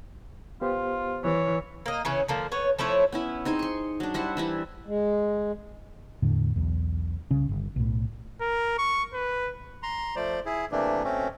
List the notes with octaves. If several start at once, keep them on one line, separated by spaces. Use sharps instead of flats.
B3 F4 G4 C5
E3 C#5
A#3 D#5
C#3 E3 C#4
D3 F3 A#3
B3 C#5
F3 A3 E4 C#5
B3 C#4 E4
C4 D#4 G#4 G#5
C6 C#6
F#3 D4
G3 E4 C5 F#5
E3 G3 E4
G#3
E2 A2 D3
B1 E2
C2 C#3 C#4
G1
B1 A2
A#4
C#6
B4
A#5 C6
F3 A3 C5 D5
E4 G#4
C3 E3 A3 A#3 D4
B2 A3 C4 C#4